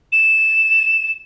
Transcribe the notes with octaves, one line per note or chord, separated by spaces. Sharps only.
E7